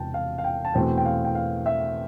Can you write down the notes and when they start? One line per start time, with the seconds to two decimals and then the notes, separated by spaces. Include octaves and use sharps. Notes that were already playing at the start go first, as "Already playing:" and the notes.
Already playing: E1 E2 C3 G5 A5
0.14 F5
0.38 F5
0.44 G5
0.65 A5
0.74 E2 B2 A3 C4 G5
0.97 G5
1.05 F5
1.25 G5
1.35 F5
1.66 E5